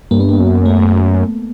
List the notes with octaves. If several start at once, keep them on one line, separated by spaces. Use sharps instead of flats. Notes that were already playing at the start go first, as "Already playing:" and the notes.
G2 A#3
B3
A#3
F#2
A3